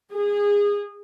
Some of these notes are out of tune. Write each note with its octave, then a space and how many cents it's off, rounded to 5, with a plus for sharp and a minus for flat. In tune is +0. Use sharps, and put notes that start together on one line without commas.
G#4 -20